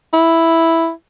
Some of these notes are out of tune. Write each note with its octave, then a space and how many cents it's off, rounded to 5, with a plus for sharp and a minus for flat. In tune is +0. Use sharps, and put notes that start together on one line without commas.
E4 +0